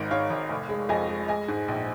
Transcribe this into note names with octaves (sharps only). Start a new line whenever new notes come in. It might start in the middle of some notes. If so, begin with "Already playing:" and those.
Already playing: G#1 G#2 A#4 D#5
G#2 C#5 F5
G#1
F1
G#3
F2 D#5 G#5
G#3
G#3 D#5 G#5
G#2
A#1